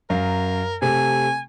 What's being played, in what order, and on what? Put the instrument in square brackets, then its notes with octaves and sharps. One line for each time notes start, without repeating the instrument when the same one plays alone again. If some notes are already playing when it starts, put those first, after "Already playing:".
[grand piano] F#2 F5 [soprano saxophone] A#4
[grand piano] C3 A3 [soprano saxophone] G#5